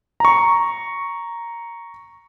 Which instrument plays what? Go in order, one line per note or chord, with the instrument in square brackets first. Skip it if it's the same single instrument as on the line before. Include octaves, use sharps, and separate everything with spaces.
[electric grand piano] A#5 C#6